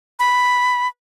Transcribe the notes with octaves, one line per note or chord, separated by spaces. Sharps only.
B5